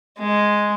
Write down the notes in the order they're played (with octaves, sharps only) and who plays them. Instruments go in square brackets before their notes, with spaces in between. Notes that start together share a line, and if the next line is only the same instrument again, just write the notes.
[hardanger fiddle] G#3